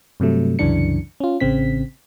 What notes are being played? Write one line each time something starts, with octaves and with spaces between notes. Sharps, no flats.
G2 C3 F#3 A3
C2 F#2 C#3 E3 D4 C#7
C#4 F4
A1 C#3 C4 B6